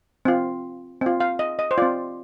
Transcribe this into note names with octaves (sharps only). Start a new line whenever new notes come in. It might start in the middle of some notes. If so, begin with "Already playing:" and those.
C4 F4
C4 F4
F5
D#5
D#5
C5
C4 F4 D5